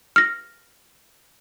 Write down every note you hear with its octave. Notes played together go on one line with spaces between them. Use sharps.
F6 A#6